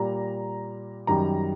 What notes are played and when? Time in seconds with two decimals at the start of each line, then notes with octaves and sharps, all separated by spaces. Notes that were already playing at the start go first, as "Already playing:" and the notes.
Already playing: A#2 G3 A#5
1.07 F#2 D#3 G3 A#5